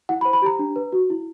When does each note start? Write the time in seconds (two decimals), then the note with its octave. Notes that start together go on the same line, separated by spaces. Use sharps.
0.09 E4 F#5
0.21 B5
0.25 C5
0.33 B5
0.42 G4 A#5
0.59 D4
0.76 B4
0.92 F#4
1.10 E4